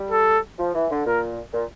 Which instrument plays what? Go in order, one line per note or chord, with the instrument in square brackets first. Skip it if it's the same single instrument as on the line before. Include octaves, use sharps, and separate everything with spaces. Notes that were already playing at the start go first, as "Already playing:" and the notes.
Already playing: [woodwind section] G3
[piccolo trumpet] A4
[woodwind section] F3
E3
D3
[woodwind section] A#2 [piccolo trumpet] A#4
[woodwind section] A#2